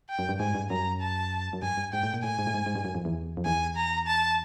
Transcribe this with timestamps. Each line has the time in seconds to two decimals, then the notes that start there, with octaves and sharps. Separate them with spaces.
0.09 G5
0.19 F#2
0.29 G2
0.40 G#2 G#5
0.55 G2
0.70 F#2 A#5
1.01 A5
1.53 F#2
1.62 G2 G#5
1.77 G2
1.93 G#2 G5
2.03 A2
2.14 A#2
2.23 A2 G#5
2.39 G#2
2.47 A2
2.54 G#2
2.66 G#2
2.76 G2
2.85 F#2
2.95 F2
3.05 E2
3.37 F2
3.45 E2 G#5
3.77 A#5
4.07 A5